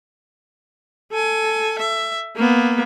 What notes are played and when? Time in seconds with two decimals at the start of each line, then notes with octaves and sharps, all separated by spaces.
1.12 A4 G#5
1.79 E5
2.36 A#3 B3